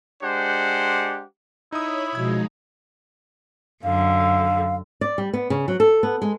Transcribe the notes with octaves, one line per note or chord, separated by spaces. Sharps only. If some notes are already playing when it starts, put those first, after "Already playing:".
G#3 D4 G4 C5 F#5
D#4 E4 C#5 B5 D#6
B2 F3 G#3 D#4 G#6
F#2 D3 F5
D5
G3
B3
C#3
F#3
A4
B3
G#3